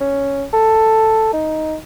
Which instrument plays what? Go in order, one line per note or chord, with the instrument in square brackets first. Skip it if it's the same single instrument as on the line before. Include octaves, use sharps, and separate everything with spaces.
[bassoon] C#4
A4
D#4